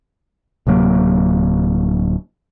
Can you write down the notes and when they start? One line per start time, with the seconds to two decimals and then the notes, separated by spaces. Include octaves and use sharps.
0.67 D1 C3 F#3 A#3